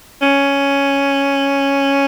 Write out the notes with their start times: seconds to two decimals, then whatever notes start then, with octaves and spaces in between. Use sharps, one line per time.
0.22 C#4